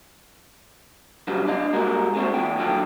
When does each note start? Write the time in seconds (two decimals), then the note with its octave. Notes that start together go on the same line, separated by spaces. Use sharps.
1.27 C#3 F#3 G3 B3 D4
1.48 D4 D5 D#5 F5
1.73 G3 G#3 A#3 F#4 G#4 A#4
2.15 G#3 A3 C4 D4 F#4
2.34 E2 A#2 B3 G5
2.57 D#2 D3 F#3 D4 D#5 G5